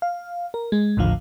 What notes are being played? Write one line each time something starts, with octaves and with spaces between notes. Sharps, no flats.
F5
A#4
G#3
A1 D#2 A2 D3 F3 F5